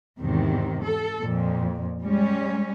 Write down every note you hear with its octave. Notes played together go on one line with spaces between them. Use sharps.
E2 G#2 C3 D#3
A4
F2 A#2
G3 G#3 C#4